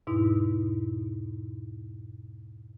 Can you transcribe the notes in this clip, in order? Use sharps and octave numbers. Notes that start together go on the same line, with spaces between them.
E2 G#2 B2 D#4 E4